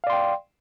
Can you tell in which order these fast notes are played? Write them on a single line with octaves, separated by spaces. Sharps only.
F5 D5 C6 G5